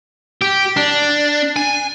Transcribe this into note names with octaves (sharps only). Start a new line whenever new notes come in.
G4
D4
G#5